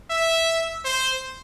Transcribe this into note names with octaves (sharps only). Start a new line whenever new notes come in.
E5
C5